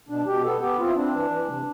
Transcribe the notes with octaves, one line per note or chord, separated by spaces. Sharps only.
B2 D4
B2 G4
B3 A4
B3 G4
C4 F4
E4
C4 D4
E3
E3
C3